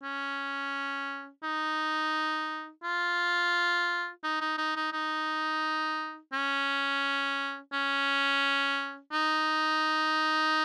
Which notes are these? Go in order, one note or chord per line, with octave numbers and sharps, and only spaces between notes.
C#4
D#4
F4
D#4
D#4
D#4
D#4
D#4
C#4
C#4
D#4